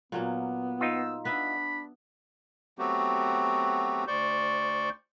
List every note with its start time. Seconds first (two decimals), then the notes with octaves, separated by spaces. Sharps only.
0.12 A#2 F#3 A#3 B3
0.81 D#4 F4 E6
1.25 B3 D4 B4 E5 B5
2.78 F#3 A3 B3 C4 F#4 G4
4.08 D2 C5 D5 C#6 G6